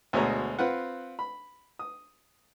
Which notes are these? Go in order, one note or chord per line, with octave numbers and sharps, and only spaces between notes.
D2 B2 G#3 C#5 D#5 A#5
C4 F4 B4 F#5
B5
D#6